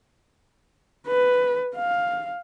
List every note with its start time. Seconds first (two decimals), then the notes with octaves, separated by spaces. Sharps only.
1.07 B4
1.75 F5